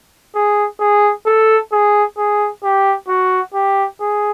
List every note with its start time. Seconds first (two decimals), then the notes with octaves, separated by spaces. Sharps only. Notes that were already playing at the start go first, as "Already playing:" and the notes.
0.35 G#4
0.80 G#4
1.26 A4
1.72 G#4
2.18 G#4
2.63 G4
3.09 F#4
3.54 G4
4.00 G#4